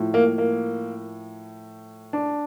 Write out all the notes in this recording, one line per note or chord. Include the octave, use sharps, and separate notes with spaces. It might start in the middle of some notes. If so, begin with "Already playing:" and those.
Already playing: A2 F3
A#3
A#3
D4